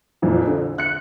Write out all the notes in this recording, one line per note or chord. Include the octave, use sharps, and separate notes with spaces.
F2 A#2 E3
D3
F#6 C#7